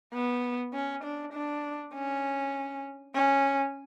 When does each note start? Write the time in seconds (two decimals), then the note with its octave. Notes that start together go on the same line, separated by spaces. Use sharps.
0.13 B3
0.74 C#4
1.04 D4
1.33 D4
1.94 C#4
3.14 C#4